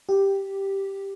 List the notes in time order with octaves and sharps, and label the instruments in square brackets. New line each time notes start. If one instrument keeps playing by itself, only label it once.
[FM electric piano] G4